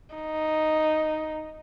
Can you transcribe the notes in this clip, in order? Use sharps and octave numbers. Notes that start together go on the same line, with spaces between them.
D#4